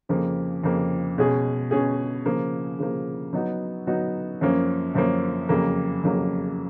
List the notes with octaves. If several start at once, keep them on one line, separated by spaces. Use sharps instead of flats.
F2 C#3 F3 A#3
F2 C#3 F3 A#3
B2 G#3 C#4 G#4
B2 G#3 C#4 G#4
C#3 F3 A#3
C#3 F3 A#3
F#3 B3 D#4 F#4
F#3 B3 D#4 F#4
F#2 F3 A#3 C#4
F#2 F3 A#3 C#4
F2 C#3 F#3 A#3
F2 C#3 F#3 A#3